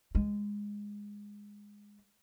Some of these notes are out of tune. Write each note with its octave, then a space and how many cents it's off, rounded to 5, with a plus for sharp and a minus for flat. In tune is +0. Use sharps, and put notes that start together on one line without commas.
G#3 -15